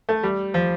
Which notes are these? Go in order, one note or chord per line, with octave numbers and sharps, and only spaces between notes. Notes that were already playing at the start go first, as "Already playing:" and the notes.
A3
G3
F3